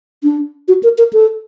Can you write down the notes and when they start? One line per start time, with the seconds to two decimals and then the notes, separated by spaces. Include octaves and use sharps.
0.23 D4
0.68 F#4
0.83 A#4
0.98 A#4
1.13 A4